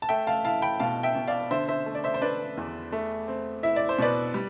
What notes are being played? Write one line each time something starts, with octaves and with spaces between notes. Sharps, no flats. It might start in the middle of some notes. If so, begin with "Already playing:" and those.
A5
A3 E5 G5
F5 A5
E4 F5 A5
G5 B5
B2 F5 A5
E5 G5
B2
D5 F5
D3 C5 E5
C5 E5
A3
D5
C5 E5
C5
D4 B4 D5
E2
A3
C4
E4 E5
D5
C5
B2 B4 D5
G3